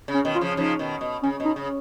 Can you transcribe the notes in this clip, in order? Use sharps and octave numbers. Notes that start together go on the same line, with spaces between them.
C#3
C#4
B2 D#3
F4
C#3 F3
C#3 F3 D#4
B2 D#3
B2
C#3 C#4
B2 D#4
C#3